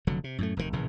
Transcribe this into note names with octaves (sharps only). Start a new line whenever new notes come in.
F1 D3 F#3
C3
F#2 A2 A3
F1 D#2 G#2 D#3
A#1 A2 C#3 E3